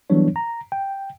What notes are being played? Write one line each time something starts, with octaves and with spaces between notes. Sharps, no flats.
E3 F#3 G3 B3 D4 C#5
A#5
G5